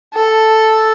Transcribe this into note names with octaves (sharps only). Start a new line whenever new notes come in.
A4